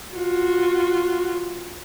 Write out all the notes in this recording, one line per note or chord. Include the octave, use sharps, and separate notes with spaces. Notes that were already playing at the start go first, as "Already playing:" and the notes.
F4 F#4